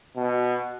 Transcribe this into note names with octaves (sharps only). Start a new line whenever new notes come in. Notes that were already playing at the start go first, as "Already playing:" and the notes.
B2